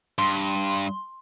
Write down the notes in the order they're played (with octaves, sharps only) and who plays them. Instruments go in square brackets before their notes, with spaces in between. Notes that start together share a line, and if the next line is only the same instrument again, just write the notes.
[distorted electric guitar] G2 [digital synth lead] C6